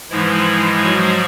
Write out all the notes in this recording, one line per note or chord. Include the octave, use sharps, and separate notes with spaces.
G#2 E3 F3 G#3 E4
F#3 F#4